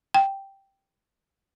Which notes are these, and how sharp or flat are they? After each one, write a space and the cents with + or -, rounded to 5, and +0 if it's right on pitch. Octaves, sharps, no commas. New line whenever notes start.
G5 -5